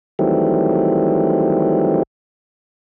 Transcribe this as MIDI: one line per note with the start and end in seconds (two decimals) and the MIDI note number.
0.19 2.03 51
0.19 2.03 52
0.19 2.03 54
0.19 2.03 55
0.19 2.03 57
0.19 2.03 60